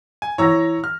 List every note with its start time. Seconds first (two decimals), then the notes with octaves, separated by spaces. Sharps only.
0.22 G#5
0.38 E3 C#5 A#5 E6 A#6
0.84 F6